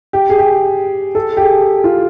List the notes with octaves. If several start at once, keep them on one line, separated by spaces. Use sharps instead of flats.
G4
G#4
G4
A4
G4
G#4
F4